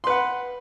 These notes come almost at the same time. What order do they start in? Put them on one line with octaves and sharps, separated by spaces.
C6 B4 F#5